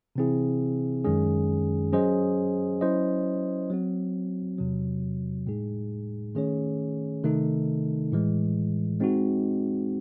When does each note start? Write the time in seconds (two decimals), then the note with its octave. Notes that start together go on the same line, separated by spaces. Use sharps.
0.16 C3 E3 C4 E4 G#4
1.04 F#2 D#3 G#3 C#4 G#4
1.93 F#3 C#4 G#4 C5 D#5
2.81 F#3 C#4 E4 C5 D#5
3.70 F#3 C4 F#4
4.58 E2 C3 F#3
5.46 A2 G#3 D#4 G#4
6.35 D#3 A3 C#4 G#4 C#5
7.23 C3 D#3 A3 D#4 A4
8.12 A2 E3 G#3
9.00 G#3 C4 D#4 F#4